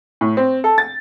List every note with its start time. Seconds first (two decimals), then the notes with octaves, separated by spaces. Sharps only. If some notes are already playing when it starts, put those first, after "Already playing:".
0.21 A2
0.37 C4
0.64 A4
0.78 A6